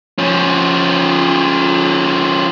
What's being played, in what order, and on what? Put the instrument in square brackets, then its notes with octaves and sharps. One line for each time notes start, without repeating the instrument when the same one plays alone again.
[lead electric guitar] F3 C#4